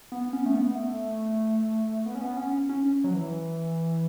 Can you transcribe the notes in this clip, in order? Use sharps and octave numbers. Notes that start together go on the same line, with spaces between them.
B3
C#4
A3
B3
A3
B3
C#4
B3
C#4
C#4
F#3
E3